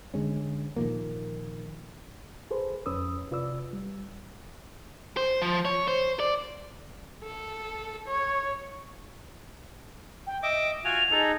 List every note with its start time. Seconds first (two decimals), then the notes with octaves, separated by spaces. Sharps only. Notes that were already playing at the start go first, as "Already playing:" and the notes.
0.14 D3 G#3 C#4
0.76 A#2 D#3 F3 A#3
2.51 G#4 A4 B4 C5
2.86 F2 C#4 B4 D#6 E6
3.31 C3 F4 B4 D5 E6
3.73 G3
5.17 C5
5.42 F3
5.65 C#5
5.88 C5
6.20 D5
7.23 A4
8.07 C#5
10.27 G5
10.43 D#5 E5 D6 D7
10.85 F4 F#4 G#5 F7
11.11 D#4 G#4 A4